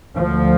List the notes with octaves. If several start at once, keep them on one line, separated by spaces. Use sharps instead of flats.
D2 F3